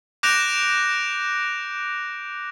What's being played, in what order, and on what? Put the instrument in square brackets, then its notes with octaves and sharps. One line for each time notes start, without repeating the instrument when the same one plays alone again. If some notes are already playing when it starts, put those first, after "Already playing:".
[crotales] D6 F#6 G6 A#6 D7 F7